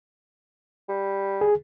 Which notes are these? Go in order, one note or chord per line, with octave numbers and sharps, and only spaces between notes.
G3
G#4